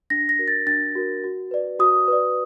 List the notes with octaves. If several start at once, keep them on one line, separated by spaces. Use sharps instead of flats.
D4 A#6
A#6
F#4 A#4
A6
D4 A6
F#4 A#4
F#4
B4 D5
F#4 D#6
B4 D5